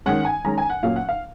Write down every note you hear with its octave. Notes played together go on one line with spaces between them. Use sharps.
D#3 G#3 C#4 F#5
G#5
D#3 G#3 C#4 A#5
G#5
F#5
A#2 F#3 C#4 F5
F#5
F5